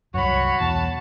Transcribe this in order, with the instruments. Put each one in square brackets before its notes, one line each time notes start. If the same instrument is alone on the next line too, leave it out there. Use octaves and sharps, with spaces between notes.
[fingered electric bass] C2 F#2 [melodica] F#4 [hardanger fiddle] C#5 B5
[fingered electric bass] E2 B2 E3 [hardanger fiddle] A5